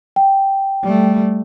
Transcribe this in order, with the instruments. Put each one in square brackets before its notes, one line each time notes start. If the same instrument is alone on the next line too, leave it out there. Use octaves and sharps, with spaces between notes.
[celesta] G5
[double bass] G3 A3